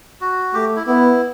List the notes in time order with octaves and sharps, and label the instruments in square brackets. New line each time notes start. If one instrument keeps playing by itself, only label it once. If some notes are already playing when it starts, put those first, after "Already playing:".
[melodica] F#4
[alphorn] A3 [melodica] G4
[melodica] E4
[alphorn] B3 [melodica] E4